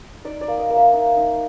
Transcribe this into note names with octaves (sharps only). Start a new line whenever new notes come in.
D#4 D5
D5
A#3
D#5
A#3
E5
D#4
D#4